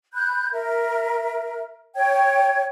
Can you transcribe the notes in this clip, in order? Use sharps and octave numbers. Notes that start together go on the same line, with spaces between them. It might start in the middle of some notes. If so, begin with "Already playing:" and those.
B5 F#6 G6
A#4 E5
C#5 G5 G#6